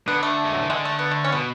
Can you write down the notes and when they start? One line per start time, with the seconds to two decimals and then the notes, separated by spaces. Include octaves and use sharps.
0.08 D3 B3
0.23 A3
0.45 G#3
0.54 F#3
0.62 E3
0.70 D3 G#3
0.85 A3
0.99 B3
1.11 A3
1.24 C#4
1.32 B2 B3